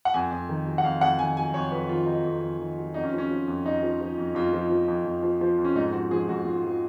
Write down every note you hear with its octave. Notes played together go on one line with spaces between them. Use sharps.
F#5
F2 G#5
F2
D#3
F#3
F#5
F2 F5
F2 F#5
D#3 G#5
F#3 G#5
F2 C#5
F2 B4
D#3 F4
F#3 D#4
F2
F2
D#3
F#3
F2 D#4
C#4
F3
C#4
F3
F2
F2 D#4
F3
F3
F2
F2 F4
F3
F3
F2
F2
F3
F3
F2
C#4
G#2 D#4
F3 F#4
F3 G#4
G#2 F#4
G#2 F4
F3